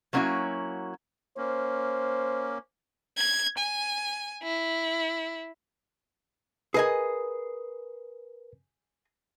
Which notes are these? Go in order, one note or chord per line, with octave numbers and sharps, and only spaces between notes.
F#3 A#3 B3 C#4 E4 F#4
A#3 C#4 C5
G#6
G#5
E4
G#4 A#4 B4 D#5 G#5